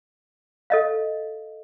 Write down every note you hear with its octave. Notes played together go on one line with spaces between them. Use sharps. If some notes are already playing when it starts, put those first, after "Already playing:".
A4 D#5 F5